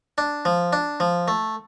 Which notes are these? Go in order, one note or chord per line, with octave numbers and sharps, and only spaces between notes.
D4
F3
D4
F3
A3